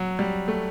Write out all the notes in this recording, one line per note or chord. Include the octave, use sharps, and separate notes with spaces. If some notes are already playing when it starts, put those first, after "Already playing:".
Already playing: F#3
G3
A3